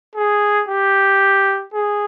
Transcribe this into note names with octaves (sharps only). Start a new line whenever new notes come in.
G#4
G4
G#4